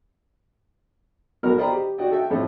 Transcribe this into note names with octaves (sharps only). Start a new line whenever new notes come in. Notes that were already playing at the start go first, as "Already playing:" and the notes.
B1 B2 F#4 A#4 F6
C5 D5 D#5 G5 A#5 B5
G4
F#4 D5 D#5 G5
F#4 A4 E5 G5
F2 A2 A4 D#5